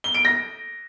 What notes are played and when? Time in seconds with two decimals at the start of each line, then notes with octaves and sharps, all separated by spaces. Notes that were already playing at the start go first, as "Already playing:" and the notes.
0.04 G7
0.14 D7
0.25 A#6